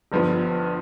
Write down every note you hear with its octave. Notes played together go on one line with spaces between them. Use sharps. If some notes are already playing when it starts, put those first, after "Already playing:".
G1 G2 F3 B3